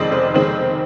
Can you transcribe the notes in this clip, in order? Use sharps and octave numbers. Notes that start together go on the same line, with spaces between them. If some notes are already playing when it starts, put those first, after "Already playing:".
Already playing: F2 D#3 G#3 C4 D5 D#5
F1 C5
D#3 G#3 C4